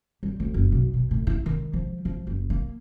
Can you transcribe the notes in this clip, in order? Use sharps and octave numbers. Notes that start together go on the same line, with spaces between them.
G3
D2
F#1
B1
B2
A2
E4
D#3
F3
F3
F#1
A#3